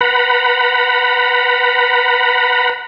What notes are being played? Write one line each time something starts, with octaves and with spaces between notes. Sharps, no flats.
B4 F#5 A#5 B5